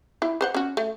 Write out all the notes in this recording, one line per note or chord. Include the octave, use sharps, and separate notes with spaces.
E4
B4 C5 F#5
C#4 F#4
A3